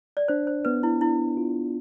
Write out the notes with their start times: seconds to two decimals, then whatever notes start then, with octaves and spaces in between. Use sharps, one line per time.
0.17 D5
0.28 D4 C5
0.47 C5
0.65 B3 B4
0.83 E4
1.01 D4 E4
1.37 F4